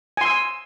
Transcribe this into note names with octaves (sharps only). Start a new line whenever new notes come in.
G#5 C6 E6